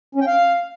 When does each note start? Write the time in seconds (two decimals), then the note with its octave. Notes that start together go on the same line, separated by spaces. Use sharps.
0.15 C#4
0.21 G5
0.27 F5